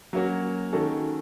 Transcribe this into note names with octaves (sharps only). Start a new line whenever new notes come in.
F#3 A#3 C#4 F#4
D#3 G#3 C#4 F#4 A4